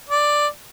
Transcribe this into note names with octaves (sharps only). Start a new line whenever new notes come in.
D5